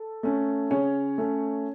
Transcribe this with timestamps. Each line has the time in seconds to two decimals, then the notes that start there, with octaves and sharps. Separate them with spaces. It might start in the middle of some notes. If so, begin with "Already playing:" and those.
Already playing: A4
0.23 A3 C#4
0.71 C#3 C#4 C#5
1.18 A3 C#4